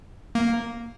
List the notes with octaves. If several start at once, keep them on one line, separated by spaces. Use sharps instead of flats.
A#3